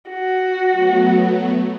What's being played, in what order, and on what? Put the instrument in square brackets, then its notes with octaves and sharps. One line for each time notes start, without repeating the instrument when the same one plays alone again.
[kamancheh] F#4
[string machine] F#3 A3 B3